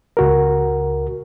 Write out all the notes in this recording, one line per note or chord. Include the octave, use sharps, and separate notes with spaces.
C#2 F#4 A#4